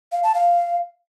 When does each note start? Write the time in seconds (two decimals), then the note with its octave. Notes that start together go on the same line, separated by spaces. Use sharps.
0.12 F5
0.23 A5
0.35 F5